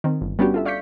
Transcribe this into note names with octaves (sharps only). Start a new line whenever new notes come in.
D#3 C4
G1
G3 B3 C#4 D4 F#4 G4
F4 A4 E5
D5 F5 C#6 G6 B6 C#7